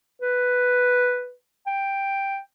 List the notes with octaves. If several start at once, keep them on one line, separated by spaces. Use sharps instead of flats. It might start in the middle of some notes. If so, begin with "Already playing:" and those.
B4
G5